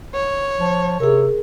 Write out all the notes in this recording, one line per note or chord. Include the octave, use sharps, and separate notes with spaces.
C#5
F3
C3 G#4 A#4